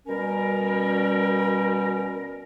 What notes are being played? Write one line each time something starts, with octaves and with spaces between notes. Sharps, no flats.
B2 G3 C#4 A#4